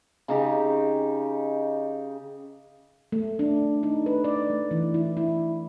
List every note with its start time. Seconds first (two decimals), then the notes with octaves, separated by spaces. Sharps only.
0.28 C#3 D#4 G4
3.12 A3
3.39 D4
3.83 D#4
4.06 B4
4.24 D5
4.50 A3
4.71 E3
4.94 E4
5.17 E4